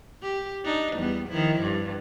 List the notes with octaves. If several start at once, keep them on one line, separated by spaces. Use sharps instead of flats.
G4
D4 D#4
E2 G3 B3
D#3 F3 E4
G2